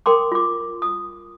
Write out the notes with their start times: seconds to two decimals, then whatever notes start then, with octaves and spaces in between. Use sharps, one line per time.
0.06 A#4 G5 C6 D6
0.32 F4 D6
0.82 D#6